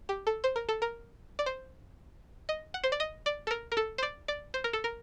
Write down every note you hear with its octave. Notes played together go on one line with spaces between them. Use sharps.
G4
A4
C5
A#4
A4
A#4
D5
C5
D#5
F#5
C5
D5
D#5
D5
A4
A#4
A#4
A4
C5
D5
D5
C5
A#4
A4
A#4